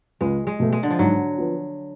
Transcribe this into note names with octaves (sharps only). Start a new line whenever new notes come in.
C#2 G#3
G#3
B2 A3
G#3
D3
F3
G#2 F#3
F3 B3